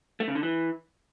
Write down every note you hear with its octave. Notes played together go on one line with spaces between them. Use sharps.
A3
C#3
D3
E3